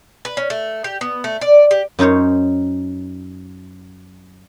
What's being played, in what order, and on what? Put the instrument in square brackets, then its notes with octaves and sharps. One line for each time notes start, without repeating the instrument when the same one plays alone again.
[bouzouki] B4
C#4
A3
G4
B3
A3
D5
G4
[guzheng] F#2 C#4 D#4 C5 C#5